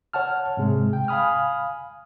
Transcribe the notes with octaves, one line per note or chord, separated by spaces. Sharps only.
C#5 F#5 A5 F6
G#2 C3 G#3
G5
F5 G#5 B5 D#6 F6